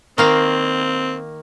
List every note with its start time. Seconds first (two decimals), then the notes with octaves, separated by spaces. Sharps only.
0.18 D#3 A#3 C4 F5